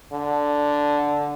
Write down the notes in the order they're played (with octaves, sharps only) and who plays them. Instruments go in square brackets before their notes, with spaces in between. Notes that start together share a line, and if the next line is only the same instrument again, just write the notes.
[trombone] D3